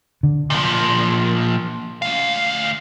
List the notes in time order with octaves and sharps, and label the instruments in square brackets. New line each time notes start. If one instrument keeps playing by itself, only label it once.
[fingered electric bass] D3
[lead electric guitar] A#2 F3
D2 F5